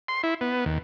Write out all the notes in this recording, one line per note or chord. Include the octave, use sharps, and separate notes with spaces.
C6
E4
B3
D#2